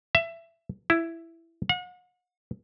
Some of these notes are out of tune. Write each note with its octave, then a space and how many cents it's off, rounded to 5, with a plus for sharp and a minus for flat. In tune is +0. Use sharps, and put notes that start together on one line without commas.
E5 +20
E4 +10
F#5 -40